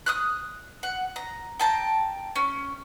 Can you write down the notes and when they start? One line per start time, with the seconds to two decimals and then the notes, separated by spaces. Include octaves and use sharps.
0.06 D#6 F6 F#6
0.83 F#5
1.16 A#5
1.60 G5 A5 A#5
2.36 C#4